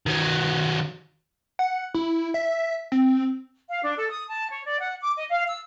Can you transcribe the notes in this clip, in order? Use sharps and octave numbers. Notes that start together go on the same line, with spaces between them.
D#3 F#3
F#5
E4
E5
C4
F5
D4
A4
D#6
A5
C#5
D5
F#5
D6
D#5
F5
E6